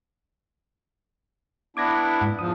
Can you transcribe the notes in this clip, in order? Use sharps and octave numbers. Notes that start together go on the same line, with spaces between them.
B3 D4 E4 D6 G#6 A#6
G#2 F#5
E2 F3 D#6